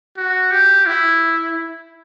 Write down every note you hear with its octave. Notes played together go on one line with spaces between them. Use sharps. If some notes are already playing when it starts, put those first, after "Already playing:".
F#4
G4
E4